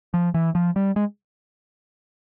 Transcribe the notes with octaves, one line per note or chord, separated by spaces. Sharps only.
F3
E3
F3
G3
G#3